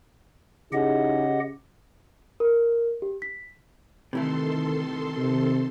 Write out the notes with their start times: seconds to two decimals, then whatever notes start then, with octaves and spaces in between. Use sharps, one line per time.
0.72 C#3 D#4 E4 G4 G#4 D#5 F#5
2.40 A#4
3.02 G4
3.22 B6
4.13 C3 D#3 E3 A3 A4 C6
5.17 C3